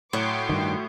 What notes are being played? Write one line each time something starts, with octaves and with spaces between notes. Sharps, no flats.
A2 F#3 G5 C6 D6
G2 D#3